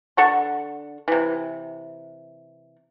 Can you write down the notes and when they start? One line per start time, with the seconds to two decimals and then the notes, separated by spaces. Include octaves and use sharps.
0.17 D3 A4 F#5 C#6
1.08 C3 E3